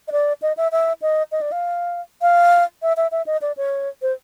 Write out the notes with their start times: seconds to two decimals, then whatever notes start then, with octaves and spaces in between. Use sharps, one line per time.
0.08 D#5
0.12 D5
0.42 D#5
0.57 E5
0.72 E5
1.02 D#5
1.32 D#5
1.41 D5
1.52 F5
2.22 F5
2.82 E5
2.97 E5
3.12 E5
3.27 D#5
3.42 D5
3.57 C#5
4.02 C5